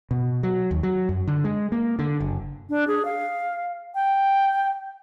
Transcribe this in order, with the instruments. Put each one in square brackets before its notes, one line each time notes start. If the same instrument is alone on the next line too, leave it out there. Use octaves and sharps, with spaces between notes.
[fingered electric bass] B2
F#3
D#2
F#3
F#2
D3
G#3
A#3
D3
F#1
[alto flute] D4
G#4
F5
G5